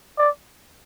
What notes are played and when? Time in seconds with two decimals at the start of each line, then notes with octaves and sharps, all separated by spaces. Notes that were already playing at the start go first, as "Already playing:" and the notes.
0.18 D5